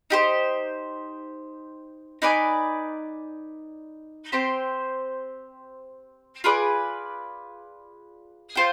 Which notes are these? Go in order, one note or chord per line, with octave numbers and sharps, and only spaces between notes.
D#4 G4 C5
D#4 B4 D5 G#5
C4 G4 C5 G5
F4 G#4 B4 D5
F4 C5 G5